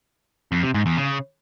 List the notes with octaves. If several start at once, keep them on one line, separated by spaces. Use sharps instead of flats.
F2
C3
G#2
E2
C#3